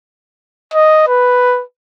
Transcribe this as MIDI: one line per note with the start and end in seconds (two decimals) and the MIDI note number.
0.74 1.06 75
1.08 1.62 71